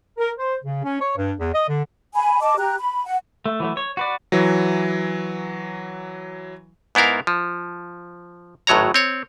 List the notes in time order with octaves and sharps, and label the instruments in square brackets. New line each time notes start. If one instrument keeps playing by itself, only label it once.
[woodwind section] A#4
C5
C#3
C#4
C#5
G2
E2
D#5
D3
[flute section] G#5 B5
D#5 A5 D6
G4 A#5 F#6
B5
F#5
[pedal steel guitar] A3
E3 F#3 A3
C#5
F#4 B4 D5
[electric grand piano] E3 F#3
[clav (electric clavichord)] G#2 B3 E4 A#4 F5
F3
G#1 A2 F#3 C#5 A#5
C4 C#5